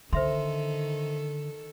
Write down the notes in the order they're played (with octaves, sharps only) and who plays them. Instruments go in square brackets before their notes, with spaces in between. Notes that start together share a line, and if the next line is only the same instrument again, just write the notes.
[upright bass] D3 [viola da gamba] D#3 A4 [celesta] C5 E5 C6